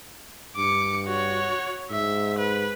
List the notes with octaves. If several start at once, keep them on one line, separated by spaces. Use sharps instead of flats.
G2 D6 C#7
F#4 C#5
G#2 E5
B4